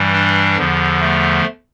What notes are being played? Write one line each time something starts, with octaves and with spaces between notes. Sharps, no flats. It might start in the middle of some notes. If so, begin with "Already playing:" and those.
Already playing: G2 E3 G3
D4
E2 D3 F3
A3